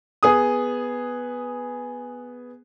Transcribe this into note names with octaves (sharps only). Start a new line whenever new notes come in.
B3 G#4 D#6